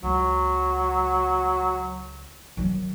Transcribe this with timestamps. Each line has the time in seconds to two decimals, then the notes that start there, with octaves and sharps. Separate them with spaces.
0.03 C#2 F#3
2.57 D#3 F#3